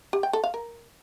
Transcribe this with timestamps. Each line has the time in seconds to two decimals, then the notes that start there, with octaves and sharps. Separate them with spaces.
0.13 G4
0.23 G5
0.33 A4
0.44 F5
0.54 A#4